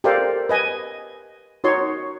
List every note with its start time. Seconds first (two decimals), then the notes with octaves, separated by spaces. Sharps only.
0.04 G4 A4 A#4 C5 D5 F5
0.49 B4 D#5 G#5
1.64 D#4 F#4 C#5 C6